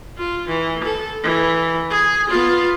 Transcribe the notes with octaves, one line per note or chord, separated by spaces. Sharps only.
F4
E3
A4
E3
G#4
B3 F4